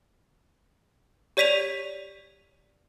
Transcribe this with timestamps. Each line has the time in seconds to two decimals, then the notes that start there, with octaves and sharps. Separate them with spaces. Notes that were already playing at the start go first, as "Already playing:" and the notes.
1.37 G4 C#5 D5 B6 D#7 F7